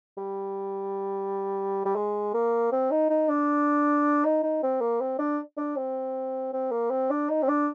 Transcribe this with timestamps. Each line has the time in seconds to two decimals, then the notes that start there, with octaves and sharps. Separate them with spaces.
0.17 G3
1.85 G3
1.96 G#3
2.34 A#3
2.72 C4
2.91 D#4
3.10 D#4
3.29 D4
4.25 D#4
4.43 D#4
4.63 C4
4.81 A#3
5.01 C4
5.19 D4
5.57 D4
5.76 C4
6.53 C4
6.72 A#3
6.90 C4
7.11 D4
7.30 D#4
7.43 C4
7.48 D4